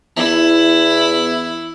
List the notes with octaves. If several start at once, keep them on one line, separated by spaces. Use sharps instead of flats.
E2 E4